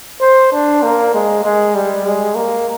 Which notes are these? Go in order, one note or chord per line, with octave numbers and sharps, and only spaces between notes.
C5
D4
A#3
G#3
G#3
G3
G#3
A#3